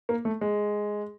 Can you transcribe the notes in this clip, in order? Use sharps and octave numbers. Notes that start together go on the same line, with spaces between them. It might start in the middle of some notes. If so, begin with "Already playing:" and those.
A#3
A3
G#3